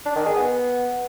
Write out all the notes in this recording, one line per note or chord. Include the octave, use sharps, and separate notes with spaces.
D4
D#3
G#4
B3